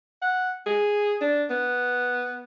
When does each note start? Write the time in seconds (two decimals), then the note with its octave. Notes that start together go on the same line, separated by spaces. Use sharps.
0.22 F#5
0.66 G#4
1.21 D4
1.50 B3